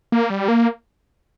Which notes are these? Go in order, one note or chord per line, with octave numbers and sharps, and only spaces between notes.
A#3
G3
A#3